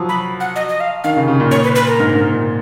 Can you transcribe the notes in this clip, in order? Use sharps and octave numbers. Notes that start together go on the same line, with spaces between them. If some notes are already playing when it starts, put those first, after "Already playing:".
Already playing: F3 F#3
B5
F#5
D#5
D#5
F5
D#3 F5
C#3
C#3
A#2
C#5
B4
B4
A#4
G#2
G#2
A#2